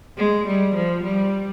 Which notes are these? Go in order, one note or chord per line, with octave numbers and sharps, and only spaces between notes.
G#3
G3
F3
G3